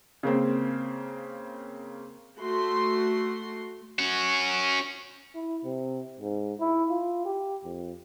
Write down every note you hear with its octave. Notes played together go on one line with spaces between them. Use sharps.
C#3 A#3 C4
A3 F#4 C6
C#4 F#4
E4
C3
G#2
E4
F4
G4
F2